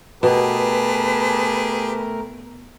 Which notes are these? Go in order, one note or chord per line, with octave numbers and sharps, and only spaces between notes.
B2 A3 G4 G#4 A#4 B4 A5